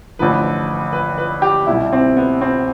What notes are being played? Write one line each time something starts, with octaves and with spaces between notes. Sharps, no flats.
A1 G2 D3 F3 B4
B4
B4
G4
C2 B2 G3 E4
C4
B3
C4